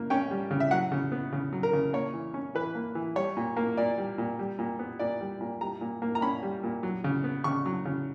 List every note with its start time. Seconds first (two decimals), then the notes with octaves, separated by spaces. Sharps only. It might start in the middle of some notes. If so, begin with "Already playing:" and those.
Already playing: C#3 A#3
0.10 C#4 G5
0.31 G3
0.51 C#3
0.60 E5
0.71 F#3 F#5
0.92 C#3
1.12 B3
1.32 C#3
1.53 F#3
1.63 A#4
1.73 C#3
1.93 A#3 C#5
2.14 E3
2.34 C#4
2.55 E3 B4
2.75 A#3
2.95 E3
3.16 G3 C#5
3.37 A#2
3.57 A#3
3.77 A#2 D5
3.98 G3
4.18 A#2
4.39 G3
4.59 A#2
4.79 B3
4.99 A#2 D5
5.21 G3
5.41 A#2
5.61 G3 A#5
5.81 A#2
6.02 A#3
6.15 A#5
6.22 C#4 B5
6.43 G3
6.63 A#2
6.83 F#3
7.04 C#3
7.24 B3
7.44 C#3 C#6
7.66 F#3
7.85 C#3